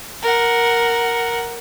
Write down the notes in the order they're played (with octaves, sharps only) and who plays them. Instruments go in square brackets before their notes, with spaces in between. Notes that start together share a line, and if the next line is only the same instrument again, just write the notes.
[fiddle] A#4 F#5